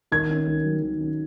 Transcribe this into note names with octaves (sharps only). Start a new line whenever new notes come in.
D#3 G#6
C#4
D#3
F#3
D#3
C#4